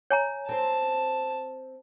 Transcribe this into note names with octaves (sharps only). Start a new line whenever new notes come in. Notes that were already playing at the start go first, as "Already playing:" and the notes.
C#5 G#5 A#5
C4 C5 A5